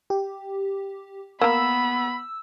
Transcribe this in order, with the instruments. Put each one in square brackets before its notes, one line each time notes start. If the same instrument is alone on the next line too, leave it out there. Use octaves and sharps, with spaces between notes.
[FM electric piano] G4
[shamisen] A#3 A#4 [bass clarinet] B3 [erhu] B5 [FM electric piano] E6